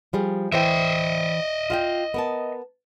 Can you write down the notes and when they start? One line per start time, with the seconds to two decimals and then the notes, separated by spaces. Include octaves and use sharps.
0.13 F3 G3 G#4
0.52 E3 C5 D#5 E5 G5
1.70 F4 F#5 G5
2.14 B3 A#4 A5